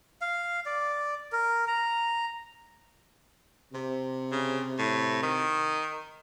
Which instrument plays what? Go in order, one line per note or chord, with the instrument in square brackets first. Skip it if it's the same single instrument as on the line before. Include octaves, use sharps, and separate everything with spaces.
[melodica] F5
D5
A#4
A#5
[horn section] C3
[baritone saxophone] C#3
A2
D#3